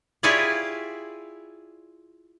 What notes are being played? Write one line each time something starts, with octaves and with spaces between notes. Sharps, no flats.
E4 F4 G4 G#4 C#5 D5